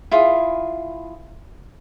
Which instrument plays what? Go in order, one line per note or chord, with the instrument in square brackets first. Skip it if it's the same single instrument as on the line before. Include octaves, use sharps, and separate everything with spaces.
[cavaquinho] E4 F4 G#4